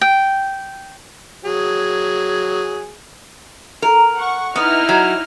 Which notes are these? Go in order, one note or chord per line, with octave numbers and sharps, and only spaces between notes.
G5
F#3 G#4
A#4
F#5 C#6
B3 D#4 E4 F6
F#3